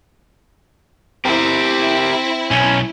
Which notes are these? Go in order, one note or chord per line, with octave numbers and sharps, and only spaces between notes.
C4 E4 G4 A#4
B1 C#4